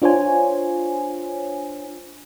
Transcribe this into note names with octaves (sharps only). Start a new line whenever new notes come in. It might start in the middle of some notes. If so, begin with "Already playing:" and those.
D4 F4 C5 C#5 G#5